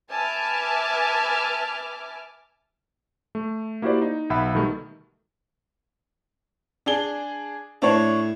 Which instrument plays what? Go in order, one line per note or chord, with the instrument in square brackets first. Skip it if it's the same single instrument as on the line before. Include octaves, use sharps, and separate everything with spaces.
[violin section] B4 E5 G#5 A5 D6 F6
[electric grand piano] A3
A#3 E4 F#4 G4 C5 D5
D#4
B1 E5 F#5 B5 E6
B2 D#3 G3 A3
[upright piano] D4 G#4 G7
[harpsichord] A2 [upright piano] D4 C#5